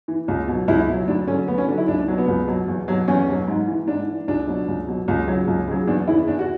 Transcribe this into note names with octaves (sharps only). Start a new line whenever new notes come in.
E3
C#2
B2 F#3
C#2 E4
B2 F#3
D2 D4
D3 F#3 C#4
D2 B3
C#4
D3 F#3 D4
E4
C#2 D4
D4
B2 F#3
B3
C#2
B2 F#3
E2
B2 F#3
E2 C#4
B2 F#3
G#2
E3
G#2 D4
E3
C#2 D4
B2 F#3
C#2
B2 F#3
C#2
C#3 F#3
C#2
C#3 F#3
E2 D4
C#3 E3 E4
E2 D4
F#4